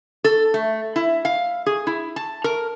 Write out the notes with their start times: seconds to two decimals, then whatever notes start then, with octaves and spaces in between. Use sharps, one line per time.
0.24 A4
0.54 A3
0.96 E4
1.25 F5
1.66 G#4
1.87 E4
2.16 A5
2.44 A#4